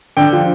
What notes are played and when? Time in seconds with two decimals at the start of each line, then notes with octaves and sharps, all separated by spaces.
0.17 D3 G5
0.33 F3